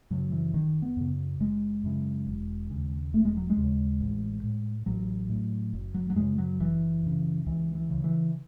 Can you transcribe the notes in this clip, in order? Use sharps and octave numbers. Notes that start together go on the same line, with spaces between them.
F#2 C#3 F#3
E3
F#1 D#3
B3
F#2 C#3
F#1 G#3
F#2 C#3
E1
D#2 C#3
E1 A3
G#3
F#3
G#3
D#2 C#3
A1
A2
A1 F#3
A2
F#1
F#3
F#3
F#2 C#3 G#3
F#3
F#1 E3
F#2 C#3
C#2 E3
E3
C#3
E3